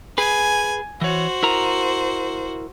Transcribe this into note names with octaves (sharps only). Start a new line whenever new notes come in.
G#4 B4 G#5
E3 F#4 C5 C#5
E4 A#4 A#5